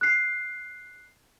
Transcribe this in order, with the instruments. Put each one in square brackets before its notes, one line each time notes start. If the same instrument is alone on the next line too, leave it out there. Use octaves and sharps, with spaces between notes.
[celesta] F#6 C7